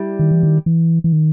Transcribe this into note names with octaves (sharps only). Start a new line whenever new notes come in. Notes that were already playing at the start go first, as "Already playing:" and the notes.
Already playing: G3 E4
D#3
E3
D#3
E3
E3
D#3